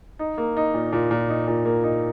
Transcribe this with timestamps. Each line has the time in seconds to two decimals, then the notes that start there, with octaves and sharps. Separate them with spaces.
0.19 D#4
0.38 A#3
0.57 D#4
0.74 A#2
0.93 A#2
1.11 A#2
1.29 D#4
1.48 A#2
1.65 A#3
1.84 D#4